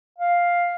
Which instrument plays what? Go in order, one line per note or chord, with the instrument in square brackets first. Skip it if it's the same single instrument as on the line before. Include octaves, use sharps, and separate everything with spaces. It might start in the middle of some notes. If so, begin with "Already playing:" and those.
[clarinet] F5